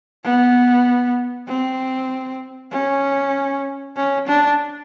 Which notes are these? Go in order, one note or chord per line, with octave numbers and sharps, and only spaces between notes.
B3
C4
C#4
C#4
D4